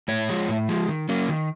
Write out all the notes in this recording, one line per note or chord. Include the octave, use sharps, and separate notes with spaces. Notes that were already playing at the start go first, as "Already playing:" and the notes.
A2 C#5
F3 G#3
A2
F3 G#3
D#3
F#3 A#3 C#4
D#3